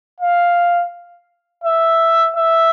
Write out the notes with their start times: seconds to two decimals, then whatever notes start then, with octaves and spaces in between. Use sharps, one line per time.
0.21 F5
1.64 E5
2.37 E5